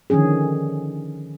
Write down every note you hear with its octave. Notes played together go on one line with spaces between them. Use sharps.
D3 D#3 F3 C#4 G#4